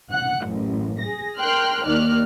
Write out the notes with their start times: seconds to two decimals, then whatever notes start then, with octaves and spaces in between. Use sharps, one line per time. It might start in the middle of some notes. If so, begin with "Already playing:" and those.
0.11 F#5 F#6
0.47 A1 F#2
1.01 G#4 A#6
1.39 A#4 G5 C6 F6 F#6
1.85 D#2 D#3 D5 F6 F#6